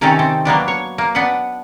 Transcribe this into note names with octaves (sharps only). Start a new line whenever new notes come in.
C3 D#3 A3 C#4 D#4 A4
C4 A4
F#3 A#3 B3 D4
C#5
A#3
B3 D4 B4 F#5